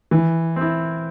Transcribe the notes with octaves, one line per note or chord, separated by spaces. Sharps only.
E3
C4 E4